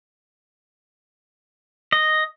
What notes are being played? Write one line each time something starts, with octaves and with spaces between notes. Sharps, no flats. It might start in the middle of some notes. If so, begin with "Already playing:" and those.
D#5